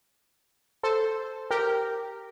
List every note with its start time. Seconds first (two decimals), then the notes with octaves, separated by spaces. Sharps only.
0.83 A4 C5
1.51 G4 A#4